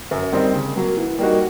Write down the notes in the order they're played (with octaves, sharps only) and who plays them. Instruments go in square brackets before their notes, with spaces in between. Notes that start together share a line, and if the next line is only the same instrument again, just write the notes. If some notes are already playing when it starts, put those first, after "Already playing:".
[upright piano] F#2
D#3 G3 C4 D#4
C#3
F#3 A#3
E3
G3 A#3 D#4 F#4